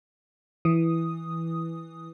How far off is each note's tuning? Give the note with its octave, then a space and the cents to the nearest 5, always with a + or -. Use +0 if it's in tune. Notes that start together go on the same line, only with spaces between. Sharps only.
E3 +0 D#6 +0